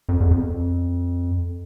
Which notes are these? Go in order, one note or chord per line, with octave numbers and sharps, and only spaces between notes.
F2
E2
F2